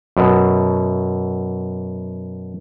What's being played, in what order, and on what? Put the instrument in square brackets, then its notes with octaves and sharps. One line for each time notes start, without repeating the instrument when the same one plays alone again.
[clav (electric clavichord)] F#2 B2